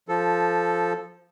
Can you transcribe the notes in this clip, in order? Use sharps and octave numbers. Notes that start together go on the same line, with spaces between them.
F3 A4